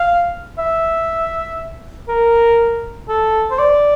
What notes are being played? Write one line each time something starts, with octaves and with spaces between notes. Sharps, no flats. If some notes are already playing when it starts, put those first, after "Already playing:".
Already playing: F5
E5
A#4
A4
C5
D5